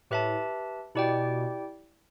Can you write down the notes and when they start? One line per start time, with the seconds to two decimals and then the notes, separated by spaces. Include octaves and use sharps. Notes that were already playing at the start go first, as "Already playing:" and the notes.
0.10 A2 G4 B4 E5 A5
0.95 B2 E4 G4 D5 G5